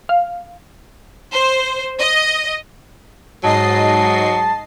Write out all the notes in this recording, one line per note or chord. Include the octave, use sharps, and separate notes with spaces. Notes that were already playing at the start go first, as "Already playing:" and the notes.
F5
C5
D#5
G#2 F#3 D#5 A5 C7